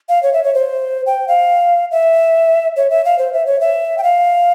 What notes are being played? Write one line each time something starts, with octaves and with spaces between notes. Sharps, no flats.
F5
C#5
E5
C#5
C5
G5
F5
E5
C#5
E5
F5
C5
E5
C#5
E5
G5
F5